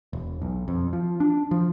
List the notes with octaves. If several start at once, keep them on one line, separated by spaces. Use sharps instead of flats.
E1
B1
F2
F3
D4
F3